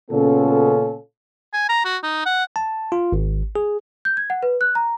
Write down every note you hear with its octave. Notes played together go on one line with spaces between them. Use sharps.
A#2 C#3 B3 C#4 F4 A4
G#5
A#5
F#4
D#4
F#5
A5
F4
G#1
G#4
G6
G#6
F#5
B4
F#6
A#5